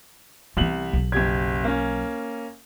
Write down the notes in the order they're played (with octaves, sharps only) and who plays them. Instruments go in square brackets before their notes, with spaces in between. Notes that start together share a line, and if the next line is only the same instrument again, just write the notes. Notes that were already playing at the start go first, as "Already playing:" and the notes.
[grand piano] C2 F#7 [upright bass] E3 B3
[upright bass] B1 F#3
[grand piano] F#1 G4 G#6
A#3 C#4